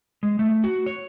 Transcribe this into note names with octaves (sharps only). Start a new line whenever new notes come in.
G#3
A3
F#4
C#5